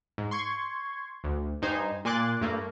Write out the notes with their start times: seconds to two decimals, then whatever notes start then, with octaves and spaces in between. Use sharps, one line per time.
0.18 G#2
0.31 C6 C#6 G#6
1.24 D2
1.62 G2 D#4 C5 G#5
2.05 A#2 G#5 C6 D6 F#6 A6
2.41 G2 A3 A#3